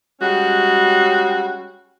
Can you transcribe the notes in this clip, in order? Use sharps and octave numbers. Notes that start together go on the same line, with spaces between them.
G3 G#3 C#4 F#4